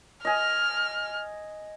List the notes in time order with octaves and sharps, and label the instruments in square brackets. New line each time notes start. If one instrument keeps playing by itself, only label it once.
[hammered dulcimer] D#5 G#5 [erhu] F6